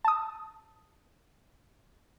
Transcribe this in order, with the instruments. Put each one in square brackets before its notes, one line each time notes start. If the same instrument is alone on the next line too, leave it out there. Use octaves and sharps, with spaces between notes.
[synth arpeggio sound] A5 D#6